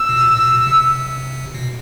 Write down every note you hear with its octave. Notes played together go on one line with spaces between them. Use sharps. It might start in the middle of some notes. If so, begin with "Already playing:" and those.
Already playing: E6
B2
A#2
B2
B2
C3
B2